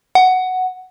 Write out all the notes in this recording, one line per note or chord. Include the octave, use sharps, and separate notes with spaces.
F#5